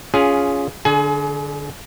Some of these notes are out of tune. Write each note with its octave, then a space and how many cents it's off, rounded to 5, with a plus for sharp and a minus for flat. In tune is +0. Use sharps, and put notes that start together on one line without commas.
C#4 +15 F4 +0 G#4 +0
D3 +0 G#4 +40 G#5 +25